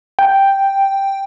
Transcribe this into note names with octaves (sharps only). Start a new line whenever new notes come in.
G5